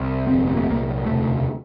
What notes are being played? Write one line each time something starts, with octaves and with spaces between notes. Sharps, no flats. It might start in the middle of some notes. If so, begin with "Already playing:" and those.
Already playing: C2
G1 F2 C3 C4
C4
A#3
A3
C2 A#2 A#3
E1 D2 C3 A3